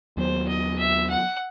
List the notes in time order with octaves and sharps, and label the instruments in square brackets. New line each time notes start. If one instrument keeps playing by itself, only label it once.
[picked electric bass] D#2 D#3 F#3 B3 [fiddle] C5
[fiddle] D#5
E5
F#5